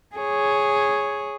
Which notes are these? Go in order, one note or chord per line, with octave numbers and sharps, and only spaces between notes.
G#4 C#5